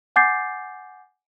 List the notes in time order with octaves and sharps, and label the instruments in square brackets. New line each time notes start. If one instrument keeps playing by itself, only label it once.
[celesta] F#5 G#5 D6 G6 A6 C7